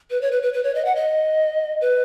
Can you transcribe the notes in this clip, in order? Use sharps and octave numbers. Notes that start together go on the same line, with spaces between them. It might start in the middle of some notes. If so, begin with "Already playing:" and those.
B4
C#5
B4
B4
B4
C#5
D#5
F#5
D#5
B4